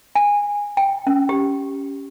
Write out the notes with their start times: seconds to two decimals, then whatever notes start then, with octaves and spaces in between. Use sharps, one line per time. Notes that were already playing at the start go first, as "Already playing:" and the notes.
0.15 G#5
0.77 G5
1.07 C#4
1.29 G4